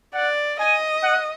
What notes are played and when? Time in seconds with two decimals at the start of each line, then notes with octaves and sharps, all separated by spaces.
0.14 D5 F#5
0.59 D#5 G#5
1.03 F#5